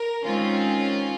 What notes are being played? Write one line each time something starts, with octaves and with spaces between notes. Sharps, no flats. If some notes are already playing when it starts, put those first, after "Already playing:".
Already playing: A#4
D#3 G#3 C4 C#4 F4